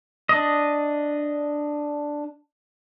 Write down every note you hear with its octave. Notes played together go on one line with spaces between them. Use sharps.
D4 D#5